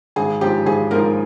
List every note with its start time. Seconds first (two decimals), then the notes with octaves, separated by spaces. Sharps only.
0.16 G#1 G#4
0.41 G#2 F3 G4
0.66 G#1 G#4
0.91 G#2 F3 A#4